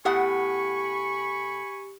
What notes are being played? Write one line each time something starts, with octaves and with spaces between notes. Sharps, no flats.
A2 B3 G4 F#5 G#5 B5 C#6